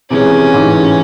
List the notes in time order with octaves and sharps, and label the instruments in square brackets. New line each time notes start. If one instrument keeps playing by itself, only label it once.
[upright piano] C3 E3 G#3 [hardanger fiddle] C#4
[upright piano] A1 G#2 E3